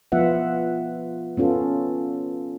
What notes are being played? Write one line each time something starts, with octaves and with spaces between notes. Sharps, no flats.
F3 B3 F4 E5 F#5
B3 C#4 F4 A4